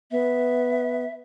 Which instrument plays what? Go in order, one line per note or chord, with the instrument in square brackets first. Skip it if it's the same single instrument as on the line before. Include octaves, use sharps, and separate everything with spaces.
[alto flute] B3 [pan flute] E5